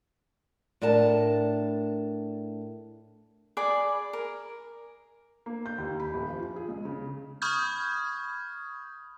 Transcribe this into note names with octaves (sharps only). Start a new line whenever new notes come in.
A2 D4 A#4 A5
G#4 D5 B5
A#4
A#3
G6
D#2
B5
D#1
F3
F4
G#4
C#2
C#3
B5 C#6 D#6 F6 G6 G#6